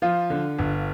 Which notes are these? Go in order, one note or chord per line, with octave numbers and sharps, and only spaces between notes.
F3 F4
D3
G1